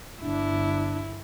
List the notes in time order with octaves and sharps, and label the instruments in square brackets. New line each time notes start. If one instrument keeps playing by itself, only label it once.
[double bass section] G1 [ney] D4 [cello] E4